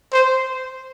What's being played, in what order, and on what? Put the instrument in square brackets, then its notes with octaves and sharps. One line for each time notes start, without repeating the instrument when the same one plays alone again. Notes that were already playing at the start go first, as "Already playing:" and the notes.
[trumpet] C5